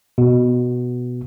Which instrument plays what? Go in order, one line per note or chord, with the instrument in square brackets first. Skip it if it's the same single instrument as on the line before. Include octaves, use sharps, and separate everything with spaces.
[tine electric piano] B2